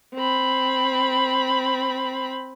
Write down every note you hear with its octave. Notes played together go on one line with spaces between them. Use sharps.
C4 B5